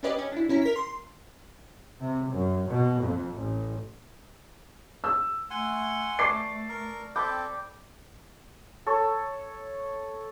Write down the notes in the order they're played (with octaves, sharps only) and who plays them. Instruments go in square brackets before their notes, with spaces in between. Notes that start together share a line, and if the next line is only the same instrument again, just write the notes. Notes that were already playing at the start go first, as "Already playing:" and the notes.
[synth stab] C#4 D4 G4 B4 D5 D#5
C#4
D4 E4
A#1 C#4 E4 A#5
A#4 B6
C6
[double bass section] C3
F#2
B2
F2
A1
[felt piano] E6
[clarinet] A3 [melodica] F#5 G#5 C6
[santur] D5 A5 C#6 [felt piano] C7
[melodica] A#4
[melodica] C4 A4 [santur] G5 B5 D6
[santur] A4 C#5